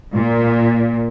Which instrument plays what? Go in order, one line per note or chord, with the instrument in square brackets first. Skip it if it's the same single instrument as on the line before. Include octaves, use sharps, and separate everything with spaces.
[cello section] A#2